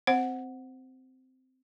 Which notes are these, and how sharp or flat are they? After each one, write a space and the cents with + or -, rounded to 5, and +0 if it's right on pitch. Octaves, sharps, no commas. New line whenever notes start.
C4 -15 C5 +0 F#5 +0